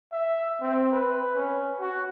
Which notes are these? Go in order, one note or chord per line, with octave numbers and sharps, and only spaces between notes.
E5
C4
B4
C#4
F#4